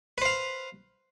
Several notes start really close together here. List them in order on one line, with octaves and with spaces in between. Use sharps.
B4 C5 F5